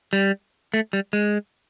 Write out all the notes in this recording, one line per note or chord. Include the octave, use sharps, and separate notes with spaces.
G3
A3
G3
G#3